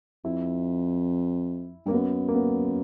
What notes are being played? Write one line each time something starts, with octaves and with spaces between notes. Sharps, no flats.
F2 E4
G2 A#3
F#2 B3
A#3
B3